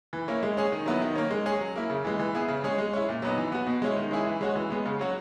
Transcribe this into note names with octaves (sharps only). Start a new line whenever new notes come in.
E3
A#3 C#4 E4
G#3
C#4 G#4
D#3
F#3 B3 E4
D#3
A#3 C#4
G#3
C#4 G#4
F#3
A#3 E4
C#3
E3 G#3
E3
B3 E4 G#4
C#3
G#3 C#4 G#4
G#3
C#4 E4
A#2
F#3 B3 D#4
E3
B3 F#4
B2
G#3 C#4 E4
D#3
G#3 C#4 E4 G#4
E3
G#3 C#4 F#4
E3
G#3 B3
C#3
F#3 C#4 F#4